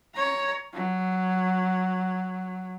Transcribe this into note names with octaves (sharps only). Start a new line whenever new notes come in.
C#5 A#5
F#3